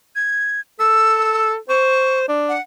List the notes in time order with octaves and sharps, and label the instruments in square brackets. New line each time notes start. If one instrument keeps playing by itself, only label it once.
[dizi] G#6
[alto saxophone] A4 [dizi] E6
[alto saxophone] C5 [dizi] C#6
[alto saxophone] D4
[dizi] F#5